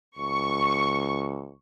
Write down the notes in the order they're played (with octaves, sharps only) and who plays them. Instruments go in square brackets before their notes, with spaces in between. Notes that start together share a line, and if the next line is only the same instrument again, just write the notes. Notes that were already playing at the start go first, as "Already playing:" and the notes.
[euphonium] C#2 [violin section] C#6